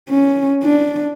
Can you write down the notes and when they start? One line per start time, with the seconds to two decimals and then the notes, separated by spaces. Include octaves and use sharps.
0.09 C#4
0.63 D4